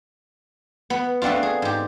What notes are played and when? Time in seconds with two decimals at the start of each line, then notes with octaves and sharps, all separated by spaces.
0.90 B3
1.22 A3 B3 C4 D4 F4
1.43 G#4
1.62 G#2 G4